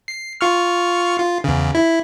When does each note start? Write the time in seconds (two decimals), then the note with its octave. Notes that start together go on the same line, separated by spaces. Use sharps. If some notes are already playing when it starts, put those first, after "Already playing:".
0.08 C7
0.41 F4 C#6 F6
1.18 F4
1.44 E2 C#3
1.75 E4